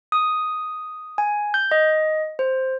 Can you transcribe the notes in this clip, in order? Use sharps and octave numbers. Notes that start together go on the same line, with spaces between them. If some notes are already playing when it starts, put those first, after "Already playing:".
D#6
G#5
G6
D#5
C5